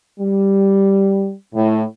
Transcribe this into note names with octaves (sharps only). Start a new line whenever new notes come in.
G3
A2